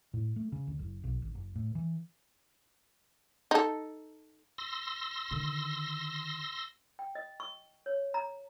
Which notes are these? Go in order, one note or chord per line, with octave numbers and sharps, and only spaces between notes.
A2
A3
C#3
D2
F#1
B1
G#1
F#1
A2
E3
D#4 A4
C6 E6 A#6
D3 D#3
G5
D#5
C#6
C#5
A#5